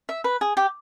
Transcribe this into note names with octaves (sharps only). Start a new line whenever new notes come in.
E5
B4
G#4
G4